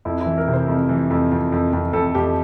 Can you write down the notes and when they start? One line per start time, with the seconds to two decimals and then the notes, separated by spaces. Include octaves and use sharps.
0.05 F2 E4
0.21 E4
0.26 E3
0.38 A#4
0.48 C3
0.53 C5
0.68 F2
0.89 E3
1.10 F2
1.32 F2
1.52 F2
1.73 F2
1.93 F2 A4
2.15 F2 G4